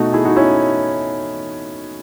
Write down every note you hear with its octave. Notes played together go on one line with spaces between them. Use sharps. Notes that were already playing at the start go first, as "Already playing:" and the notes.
Already playing: B2 A3 D#4 F#4
E4 G#4
D#4 F#4
C#4 E4